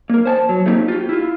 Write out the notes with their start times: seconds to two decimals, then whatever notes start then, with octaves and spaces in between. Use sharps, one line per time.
0.10 A#3 A#4
0.26 C5 G#5 A5
0.49 F#3
0.66 A3 A#3 C4 D#4 F4 G4
0.88 F4 G4
1.09 E4 F4